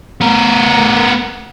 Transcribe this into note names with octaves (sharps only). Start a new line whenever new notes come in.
B3 A#4